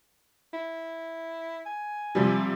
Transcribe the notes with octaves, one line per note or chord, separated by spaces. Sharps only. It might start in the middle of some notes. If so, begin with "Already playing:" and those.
E4
G#5
C3 F3 G3